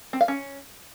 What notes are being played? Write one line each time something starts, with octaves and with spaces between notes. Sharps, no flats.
C4
F5
C#4